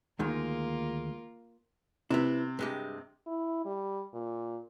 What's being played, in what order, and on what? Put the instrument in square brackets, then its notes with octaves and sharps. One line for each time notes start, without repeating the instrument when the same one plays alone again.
[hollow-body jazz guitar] D2 D#3 G#3 [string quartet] A#3 F4 A#4
[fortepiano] C3 [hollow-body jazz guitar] B3 E4
[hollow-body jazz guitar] G2 G#3 G4
[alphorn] E4
G3
A#2